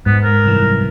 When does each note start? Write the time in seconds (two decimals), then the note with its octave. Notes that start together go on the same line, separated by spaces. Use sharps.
0.06 G#2 B3
0.24 A#4
0.44 C2 F#2 E3